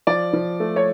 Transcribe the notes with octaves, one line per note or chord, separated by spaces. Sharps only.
F3 D5
F3
A3
C#5